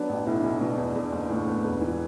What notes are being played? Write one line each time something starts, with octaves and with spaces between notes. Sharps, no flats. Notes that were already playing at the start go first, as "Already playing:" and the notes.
Already playing: F#3 B3 D4
A1
B1 E4
B1
B2 D4
E2
E2
F#1
A2
B3
E1
E3